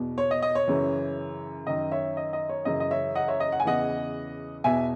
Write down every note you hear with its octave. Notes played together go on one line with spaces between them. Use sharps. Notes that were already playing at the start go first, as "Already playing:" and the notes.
Already playing: E2 B2
C#5
D#5
D#5
C#5
F#2 C#3 E3
F#2 D#3 D#5
C#5 E5
D#5
D#5
C#5
F#2 C#3 E3 D#5
D#5
C#5 E5
D#5 F#5
C#5 E5
D#5
F#5
G#5
E2 C#3 E3 D#5 F#5
E2 B2 E5 G#5